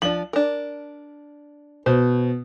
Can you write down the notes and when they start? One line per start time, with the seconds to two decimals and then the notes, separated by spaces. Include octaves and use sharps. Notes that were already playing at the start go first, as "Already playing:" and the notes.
0.02 F3 D4 F#7
0.33 D4 A#4
1.86 B2 C5